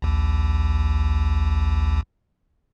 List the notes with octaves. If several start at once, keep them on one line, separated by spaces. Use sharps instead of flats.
A#1 D#2